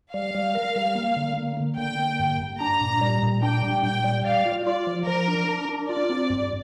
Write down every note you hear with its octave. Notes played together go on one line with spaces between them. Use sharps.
G3 F5
G3
A#4
G3
A#3
D3
A#3
A#3
D3 G5
A#3
G2
G2
D4 A#5
A#2
G3
A#2
D4 G5
G3
A#2 G5
G3
D5 F5
F4
F4 D5
F3
F3 A#4
D4
D4
D4
F4 D5
C4
G2